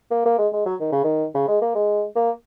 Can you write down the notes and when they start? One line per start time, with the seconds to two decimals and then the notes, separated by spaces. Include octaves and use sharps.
0.11 A#3
0.26 A#3
0.38 G#3
0.53 G#3
0.66 F#3
0.80 D#3
0.92 C#3
1.04 D#3
1.35 C#3
1.48 G#3
1.62 A#3
1.75 G#3
2.16 A#3